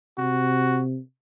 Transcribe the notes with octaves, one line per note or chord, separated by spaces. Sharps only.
C3 F#4